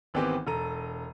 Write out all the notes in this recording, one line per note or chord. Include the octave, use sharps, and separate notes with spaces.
G#1 E3 B3 C4 G4 D6
E1 A4 A#5 D#7